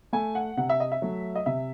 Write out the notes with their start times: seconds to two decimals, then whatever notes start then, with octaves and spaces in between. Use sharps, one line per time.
0.13 A3 G#5
0.35 F#5
0.57 C3 F#5
0.69 E5
0.80 D#5
0.92 E5
1.02 F#3 A3
1.36 D#5
1.46 C3 E5